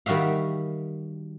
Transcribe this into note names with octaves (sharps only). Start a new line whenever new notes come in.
D#3 G3 F#4 E5 F5